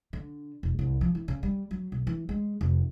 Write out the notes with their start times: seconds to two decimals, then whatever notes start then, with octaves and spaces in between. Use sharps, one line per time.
0.13 D3
0.63 E1
0.79 C2
1.01 F3
1.15 E3
1.28 C#3
1.43 G3
1.71 F#3
1.92 B1
2.07 E3
2.29 G#3
2.61 F1